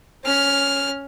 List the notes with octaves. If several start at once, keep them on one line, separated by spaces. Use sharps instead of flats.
C#4 F6